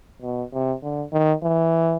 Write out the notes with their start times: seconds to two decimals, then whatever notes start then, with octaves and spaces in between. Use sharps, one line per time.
0.22 B2
0.53 C3
0.83 D3
1.12 D#3
1.43 E3